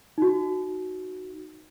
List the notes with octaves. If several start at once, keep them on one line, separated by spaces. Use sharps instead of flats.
D#4 F#4